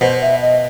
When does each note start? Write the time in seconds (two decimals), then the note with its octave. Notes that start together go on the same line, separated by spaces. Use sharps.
0.01 B2 C5
0.22 E5
0.42 D#5